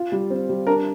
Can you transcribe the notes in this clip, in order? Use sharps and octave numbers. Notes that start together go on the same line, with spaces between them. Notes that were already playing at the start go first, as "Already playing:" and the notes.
Already playing: F4
G3
C4
G3
D4 A#4